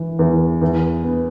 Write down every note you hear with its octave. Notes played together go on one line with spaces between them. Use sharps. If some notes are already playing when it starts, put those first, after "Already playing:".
Already playing: E3
E2
E2
B3